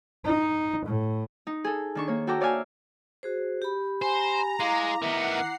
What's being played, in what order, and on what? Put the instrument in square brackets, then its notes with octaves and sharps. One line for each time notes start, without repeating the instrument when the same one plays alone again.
[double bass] D#4
A2
[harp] D#4
G#4 A4
D#3 D4 C#6
A#3 C#5
F#4 A4 G5 A#5 D6
C#5 D5 E5 F5 G#5
[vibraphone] F#4 G#4 C5
G4 B5
[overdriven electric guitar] C5 [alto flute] G#5 [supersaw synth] A#5
[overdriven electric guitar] G#3 [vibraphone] E4 D6 [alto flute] F5
[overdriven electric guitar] D#3 B3 [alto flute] E5 [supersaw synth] F#5 C7